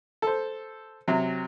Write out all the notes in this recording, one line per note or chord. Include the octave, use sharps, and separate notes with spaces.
A4 C5
C3 F#3